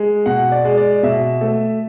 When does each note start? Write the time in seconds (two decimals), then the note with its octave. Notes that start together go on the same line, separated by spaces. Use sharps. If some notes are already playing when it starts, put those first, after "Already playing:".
Already playing: G#3
0.26 B2 F#5
0.52 D5
0.64 G#3
0.77 D5
1.03 B2 E5
1.41 A3